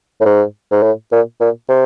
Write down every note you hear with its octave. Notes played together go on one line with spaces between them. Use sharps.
A2
G#2
G#2
A2
A#2
A#2
C3